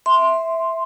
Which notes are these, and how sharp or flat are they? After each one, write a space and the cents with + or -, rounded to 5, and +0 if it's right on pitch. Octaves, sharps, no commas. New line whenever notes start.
E5 -5 C6 +0